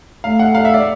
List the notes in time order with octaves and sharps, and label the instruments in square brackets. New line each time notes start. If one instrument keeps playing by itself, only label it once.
[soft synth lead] A3 [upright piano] F5
[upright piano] F#5
F5
E5
D5